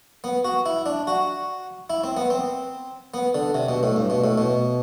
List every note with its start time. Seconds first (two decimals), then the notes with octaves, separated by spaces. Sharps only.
0.24 B3
0.44 F#4
0.66 E4
0.86 D4
1.07 F#4
1.90 E4
2.04 C4
2.17 B3
2.30 C4
3.14 B3
3.35 D3
3.55 C3
3.69 B2
3.83 A2
3.96 G2
4.10 B2
4.24 A2
4.38 B2